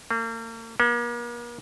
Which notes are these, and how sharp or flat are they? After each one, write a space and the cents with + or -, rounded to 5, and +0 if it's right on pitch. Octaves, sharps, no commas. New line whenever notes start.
A#3 -40
A#3 +40